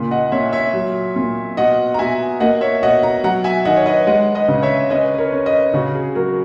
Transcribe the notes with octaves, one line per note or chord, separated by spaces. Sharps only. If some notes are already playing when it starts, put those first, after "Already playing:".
Already playing: A#2 C#3
D#5 F#5
A#2 C#5 E5
C#5 E5
F#3
A#2
B2 D#5 F#5
A#5
B2 E5 G#5
A#3 D#5 F#5
C#5 E5
B2 D#5 F#5
F#5 A#5
F#3 F#5 A#5
E5 G#5
D#3 D#5 F#5
C#5
B4 D#5
G#3 D#5 F#5
B4 D#5
C#3
C#5 E5
C#4 B4 D#5
B4
A#4 C#5
C#4
B4 D#5
C#3 F#4
G#4
F#3 F#4 A#4